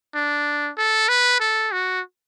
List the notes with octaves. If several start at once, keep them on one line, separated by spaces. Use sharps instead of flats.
D4
A4
B4
A4
F#4